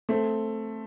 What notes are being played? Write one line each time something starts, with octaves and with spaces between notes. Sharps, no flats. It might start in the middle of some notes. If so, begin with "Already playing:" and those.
A3 C4